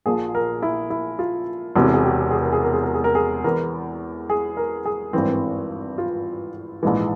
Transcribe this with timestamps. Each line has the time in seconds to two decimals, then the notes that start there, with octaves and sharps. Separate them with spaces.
0.06 A#1 A#2 F3 G#4
0.35 A#4
0.62 E4
0.90 E4
1.19 F4
1.76 E1 E2 C3
1.94 G#4
2.04 G4
2.31 G#4
2.42 A#4
2.52 G#4
2.63 A#4
2.73 G#4
2.84 A#4
2.94 G#4
3.04 A#4
3.15 G#4
3.44 E2 E3 A#4
4.30 G#4
4.57 A#4
4.85 G#4
5.13 G#1 G2 E3 C4
5.98 F4
6.83 A#1 G#2 E3